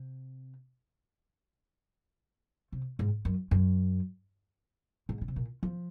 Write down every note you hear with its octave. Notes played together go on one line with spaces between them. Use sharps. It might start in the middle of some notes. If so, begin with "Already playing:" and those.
Already playing: C3
C3
G#2
F#2
F#2
G#2
C#3
C3
A#2
F3